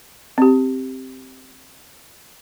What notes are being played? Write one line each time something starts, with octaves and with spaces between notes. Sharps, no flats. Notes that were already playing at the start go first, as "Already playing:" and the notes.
C4 G4